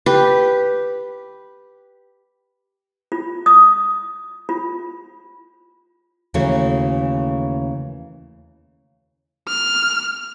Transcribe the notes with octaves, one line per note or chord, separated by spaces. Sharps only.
G4 B4
F4
D#6
F4
D#2 C#3 E3 A3 F#4 C#5
F6